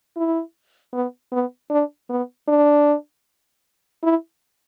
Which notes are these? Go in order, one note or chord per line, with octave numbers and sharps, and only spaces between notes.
E4
B3
B3
D4
B3
D4
E4